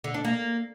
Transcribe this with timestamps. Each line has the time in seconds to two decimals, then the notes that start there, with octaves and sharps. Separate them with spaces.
0.04 D3
0.14 D4
0.25 A#3